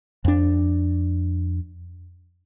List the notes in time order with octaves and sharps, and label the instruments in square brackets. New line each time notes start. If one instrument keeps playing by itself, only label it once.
[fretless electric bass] F2 D4